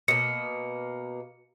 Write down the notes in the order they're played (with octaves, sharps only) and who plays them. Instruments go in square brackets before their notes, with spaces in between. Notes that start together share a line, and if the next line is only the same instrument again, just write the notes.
[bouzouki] B2 A#3 [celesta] C#7